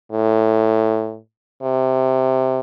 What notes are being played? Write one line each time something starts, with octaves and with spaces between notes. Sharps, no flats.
A2
C3